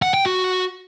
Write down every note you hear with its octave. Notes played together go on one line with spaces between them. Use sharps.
F#5
G5
F#4